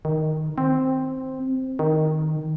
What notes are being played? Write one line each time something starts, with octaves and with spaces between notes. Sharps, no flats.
D#3
C4
D#3